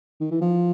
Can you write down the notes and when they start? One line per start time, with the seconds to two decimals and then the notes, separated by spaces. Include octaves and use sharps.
0.20 D#3
0.31 E3
0.41 F3